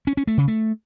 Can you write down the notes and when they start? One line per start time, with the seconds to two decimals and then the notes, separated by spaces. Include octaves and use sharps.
0.07 C#4
0.17 C#4
0.27 A3
0.38 C#3
0.48 A3